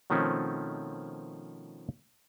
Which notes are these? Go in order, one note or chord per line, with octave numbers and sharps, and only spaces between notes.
B2 D#3 F3 A3 C4 C#4